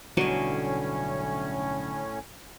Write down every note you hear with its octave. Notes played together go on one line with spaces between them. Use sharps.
B1 A2 D3 F#3 G3 B3 C#4 D#5